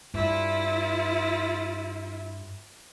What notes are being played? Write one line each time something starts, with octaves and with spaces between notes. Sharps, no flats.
G2 E4 F4